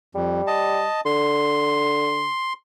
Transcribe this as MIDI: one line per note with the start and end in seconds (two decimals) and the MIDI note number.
0.15 0.41 41
0.15 0.85 55
0.47 1.01 75
0.47 1.01 81
1.06 2.29 50
1.06 2.53 84